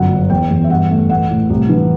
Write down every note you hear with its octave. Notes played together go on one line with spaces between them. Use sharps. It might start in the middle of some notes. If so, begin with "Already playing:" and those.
Already playing: G1 F#2 F#5
F#2
E2 G5
E2
E5
G2 F#5
A3
A1 F#5
A2
C2
E3